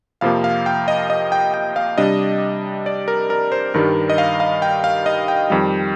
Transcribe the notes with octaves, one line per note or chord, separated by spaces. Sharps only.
F2 C3 F3 A#3 F5
F5
G5
D#5
D#5
G5
G5
F5
C3 G3 D4 D#5
D5
A#4
A#4
C5
G2 D#3 G3 A#4
D#5
F5
F5
G5
F5
D#5
G5
F2 D#3 G3